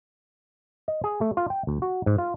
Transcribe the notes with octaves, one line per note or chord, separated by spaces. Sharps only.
D#5
G#4
A3
F4
G5
D2
F#4
G#2
F4